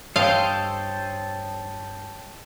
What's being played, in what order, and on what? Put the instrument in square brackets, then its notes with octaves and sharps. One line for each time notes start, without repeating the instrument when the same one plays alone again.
[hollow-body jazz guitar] G2 [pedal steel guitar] A4 C5 D#5 [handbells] C#5 G5 [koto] F5